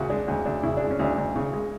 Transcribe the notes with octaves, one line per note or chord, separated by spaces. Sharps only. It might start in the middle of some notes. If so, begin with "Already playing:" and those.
Already playing: D2 C#3 E4 F#4
G#3 D4
D2
D2 D4
C#3 E4
G#3 D4
C#4
D2 D4
D2
C#3
G#3